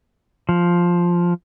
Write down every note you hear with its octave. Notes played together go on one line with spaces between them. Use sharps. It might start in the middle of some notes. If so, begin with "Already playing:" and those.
F3